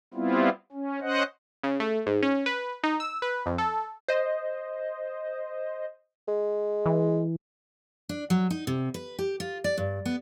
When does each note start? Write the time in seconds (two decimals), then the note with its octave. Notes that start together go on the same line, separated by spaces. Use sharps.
0.14 G3 B3 C4 E4 F4
0.72 C#4
1.01 C#4 C5 D#5 F#5
1.64 C#3
1.80 A3
2.07 G#2
2.22 C#4
2.46 B4
2.84 D#4
3.00 E6
3.22 B4
3.46 F2
3.58 A4
4.08 C5 D#5
6.28 G#3
6.86 E3
8.09 D4
8.30 F#3
8.50 D#4
8.67 C3
8.94 B4
9.19 G4
9.40 F4
9.64 D5
9.77 G2
10.05 B3